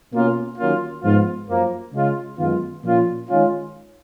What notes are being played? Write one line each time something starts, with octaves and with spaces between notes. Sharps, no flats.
B2 A#3 C#4 F4
D#3 F#3 A#3 C#4 F4
G#2 F3 B3 F4
F#2 F3 A#3
C#3 G#3 C#4 F4
F#2 D#3 G#3 B3 F4
A#2 F3 A#3 C#4 F4
D#3 G#3 C#4 F4